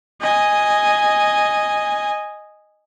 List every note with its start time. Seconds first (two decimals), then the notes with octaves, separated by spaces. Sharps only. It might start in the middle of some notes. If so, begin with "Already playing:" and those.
0.22 D#5 G#5